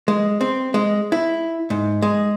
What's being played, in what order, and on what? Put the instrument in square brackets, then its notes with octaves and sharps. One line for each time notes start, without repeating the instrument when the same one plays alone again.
[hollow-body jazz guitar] G#3
C4
G#3
E4
G#2
G#3